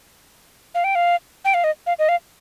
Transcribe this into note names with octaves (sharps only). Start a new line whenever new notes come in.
F5
G5
F5
G5
F5
D#5
F5
D#5
F5